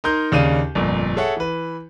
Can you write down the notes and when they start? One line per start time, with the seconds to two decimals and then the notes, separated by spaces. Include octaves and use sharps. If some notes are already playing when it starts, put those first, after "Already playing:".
0.04 D#4 A#4 C6 G6
0.32 D#2 C#3 D4 F5 D#7
0.75 G1 F2 A#2
1.16 G#4 A4 C#5 E5 F#5
1.37 E3 B4